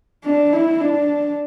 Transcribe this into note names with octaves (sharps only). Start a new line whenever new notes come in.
D4
E4
D4